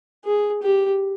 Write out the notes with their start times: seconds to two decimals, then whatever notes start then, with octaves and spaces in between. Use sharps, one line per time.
0.25 G#4
0.62 G4